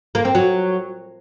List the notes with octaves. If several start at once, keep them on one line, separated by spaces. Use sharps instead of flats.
A#3
C4
F#3